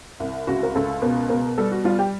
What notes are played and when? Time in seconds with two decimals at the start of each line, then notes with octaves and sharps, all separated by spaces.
0.20 C2
0.47 C#2 F#4
0.63 A#4
0.75 C#2 A4
1.02 B2 A#4
1.29 B2 A#4
1.58 G3 A4
1.72 F#4
1.84 G3 F4
1.99 G4